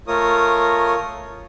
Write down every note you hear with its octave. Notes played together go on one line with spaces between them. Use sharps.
A3 F4 A#4 C#5 D#6